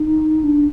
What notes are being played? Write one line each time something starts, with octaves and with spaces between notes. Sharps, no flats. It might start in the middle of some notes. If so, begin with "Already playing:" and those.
Already playing: D#4
D4